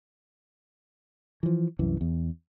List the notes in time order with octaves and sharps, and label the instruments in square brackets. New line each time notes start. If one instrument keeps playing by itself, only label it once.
[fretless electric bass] E3 F3
C2 F#2 E3
E2